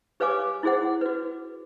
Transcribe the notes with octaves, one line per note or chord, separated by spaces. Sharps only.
G4 B4 C#5 F5 G#5 D6
E4 F#4 G#4 C5 F#5
F#4 B4